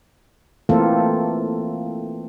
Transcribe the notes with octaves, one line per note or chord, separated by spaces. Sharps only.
E3 A3 A#3 C4 F4 A4